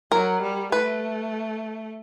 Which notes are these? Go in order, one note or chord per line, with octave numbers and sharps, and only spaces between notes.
F#3 A#4
G3
A3 B4